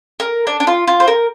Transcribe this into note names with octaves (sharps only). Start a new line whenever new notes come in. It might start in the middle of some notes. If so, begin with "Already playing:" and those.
A#4
D4
D4
F4
F4
C5
A#4